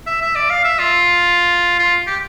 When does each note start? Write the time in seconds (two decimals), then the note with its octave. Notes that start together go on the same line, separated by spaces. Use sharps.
0.06 E5
0.21 E5
0.35 D5
0.50 F5
0.64 E5
0.79 F4
1.79 F4
2.07 G4